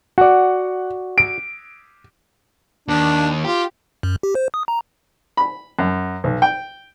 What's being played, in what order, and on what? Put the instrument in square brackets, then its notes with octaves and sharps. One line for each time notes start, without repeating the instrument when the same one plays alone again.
[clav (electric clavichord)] F#4 D5 [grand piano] F#5
[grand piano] D7
[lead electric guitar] D#2 [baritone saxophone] D4
[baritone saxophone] F4 [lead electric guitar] G4
[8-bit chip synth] F#2
G4
C5
D#6
A#5
[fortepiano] B5
F#2
B1
G5